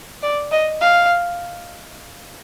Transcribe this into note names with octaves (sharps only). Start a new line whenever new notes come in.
D5
D#5
F5